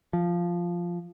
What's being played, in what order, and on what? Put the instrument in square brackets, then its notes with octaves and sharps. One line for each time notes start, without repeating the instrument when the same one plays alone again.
[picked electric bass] F3